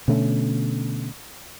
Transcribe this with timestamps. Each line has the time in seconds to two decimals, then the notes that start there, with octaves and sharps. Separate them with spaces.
0.08 B2 D3 A3 C#4